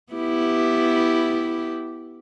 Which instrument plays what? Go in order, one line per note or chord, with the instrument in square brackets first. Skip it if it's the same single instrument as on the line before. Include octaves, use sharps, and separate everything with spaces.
[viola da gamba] B3 E4 G4